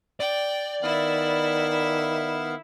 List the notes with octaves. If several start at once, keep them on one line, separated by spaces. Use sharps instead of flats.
D5 G5
D#3 B3 E4 E5 F5